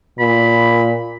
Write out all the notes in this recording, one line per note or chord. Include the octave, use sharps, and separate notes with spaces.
A#2 B5